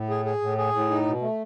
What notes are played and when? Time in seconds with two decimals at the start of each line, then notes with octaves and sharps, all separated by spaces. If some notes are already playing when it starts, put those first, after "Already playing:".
Already playing: A2
0.10 G#4
0.25 G#4
0.41 A2
0.58 G#4
0.74 A2
0.90 D#4
1.06 B2
1.22 A3